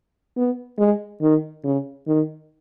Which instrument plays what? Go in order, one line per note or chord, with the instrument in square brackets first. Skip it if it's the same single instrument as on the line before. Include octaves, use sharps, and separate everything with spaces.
[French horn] B3
G#3
D#3
C#3
D#3